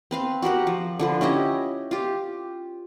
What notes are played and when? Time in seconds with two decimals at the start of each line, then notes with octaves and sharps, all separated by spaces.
0.11 C4 B4 F5
0.42 F#4 G4 A#4 F#5
0.67 F3
0.99 D3 F3 B4
1.21 C#4 E4 G4 D#5
1.91 F4 G4